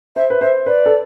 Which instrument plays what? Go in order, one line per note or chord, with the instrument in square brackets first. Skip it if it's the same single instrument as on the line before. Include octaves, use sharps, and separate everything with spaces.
[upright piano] C5 [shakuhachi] E5
[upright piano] B4
[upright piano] C5 [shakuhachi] E5
[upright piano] B4 [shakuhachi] D5
[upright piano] A4